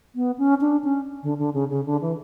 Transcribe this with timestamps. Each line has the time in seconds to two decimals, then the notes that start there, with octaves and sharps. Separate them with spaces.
0.15 B3
0.38 C#4
0.61 D4
0.84 C#4
1.23 D3
1.39 D3
1.54 C#3
1.70 C#3
1.86 D3
2.01 E3